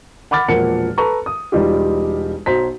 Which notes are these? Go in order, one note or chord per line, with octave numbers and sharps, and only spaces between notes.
F#5 B5 D6 F6 A6
E1 A#2 F3 A#3 F#5 C#7
A4 B4 A#5 C#6
D#6
E1 G3 D#4 F4 G4
B1 F#3 C5 A#5 B6